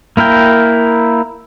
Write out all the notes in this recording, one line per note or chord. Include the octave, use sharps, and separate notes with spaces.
A#3 E4 A#4 G5